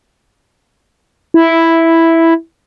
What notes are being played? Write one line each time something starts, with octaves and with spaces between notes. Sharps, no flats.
E4